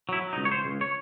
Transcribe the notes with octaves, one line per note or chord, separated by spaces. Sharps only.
F#3 E4
F#3
D#4
C#2
C#5
C#2 C5
C#2
C#5